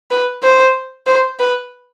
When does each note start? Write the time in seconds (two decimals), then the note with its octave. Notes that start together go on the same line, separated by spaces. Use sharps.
0.11 B4
0.43 C5
1.06 C5
1.39 B4